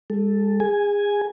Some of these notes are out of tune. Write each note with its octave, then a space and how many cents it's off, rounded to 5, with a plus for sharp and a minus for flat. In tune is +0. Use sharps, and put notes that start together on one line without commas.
G#3 -40 A4 +0
G#4 -25 G#5 +0